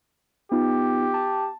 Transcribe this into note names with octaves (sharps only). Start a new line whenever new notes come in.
B3 D#4 F4 G4
A5